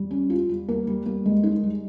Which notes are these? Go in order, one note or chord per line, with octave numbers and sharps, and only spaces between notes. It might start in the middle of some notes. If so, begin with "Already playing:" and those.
Already playing: G3
C#4
F4
G3
A#3
G3
A#3
G#3
D#4
G3